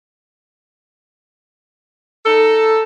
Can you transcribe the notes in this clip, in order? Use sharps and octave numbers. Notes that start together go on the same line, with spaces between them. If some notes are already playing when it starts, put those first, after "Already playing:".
D#4 A4